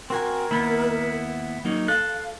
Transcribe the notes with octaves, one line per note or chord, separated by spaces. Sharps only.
C4 F#4 A#4 G#5
D#2 A#3 B3 E4 B5
F#3 A#3 D#4
A4 F5 F#6